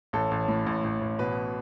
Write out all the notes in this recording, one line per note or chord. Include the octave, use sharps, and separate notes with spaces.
A1 A4
A1
A2
A1
A1
A1
B2 B4